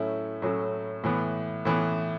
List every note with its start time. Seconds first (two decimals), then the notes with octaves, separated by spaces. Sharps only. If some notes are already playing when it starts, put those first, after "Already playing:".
Already playing: A2 F#3 A3 C#4 E4
0.42 A2 F#3 A3 C#4 E4
1.04 A2 E3 B3
1.65 A2 E3 B3